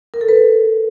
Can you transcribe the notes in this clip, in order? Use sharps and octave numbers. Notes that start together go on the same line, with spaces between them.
A#4
A4
B4